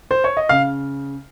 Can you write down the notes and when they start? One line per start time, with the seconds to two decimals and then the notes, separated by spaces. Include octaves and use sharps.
0.11 C5
0.24 C#5
0.37 D#5
0.49 C#3 F5